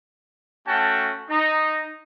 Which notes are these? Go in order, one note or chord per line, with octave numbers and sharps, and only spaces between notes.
A3 C#4 F#4 G5 A5
D#4